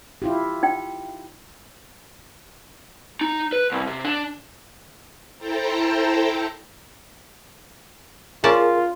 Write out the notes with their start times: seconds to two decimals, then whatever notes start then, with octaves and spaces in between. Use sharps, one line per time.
0.22 E4 F4 G4
0.63 D#4 G5
3.21 D#4
3.52 B4
3.72 C2
3.87 C3
4.05 D4
5.38 E4 A4 C5 G5 A5 A#5
8.44 C#4 F4 G#4 A#4 D5 A5